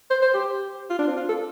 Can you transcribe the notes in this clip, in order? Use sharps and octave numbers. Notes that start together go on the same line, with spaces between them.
C5
C5
G4
F4
D4
C4
F4
A4